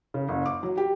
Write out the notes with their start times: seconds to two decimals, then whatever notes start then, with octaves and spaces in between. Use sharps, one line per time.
0.14 C#3
0.29 F#1
0.46 D6
0.63 F#3
0.77 G4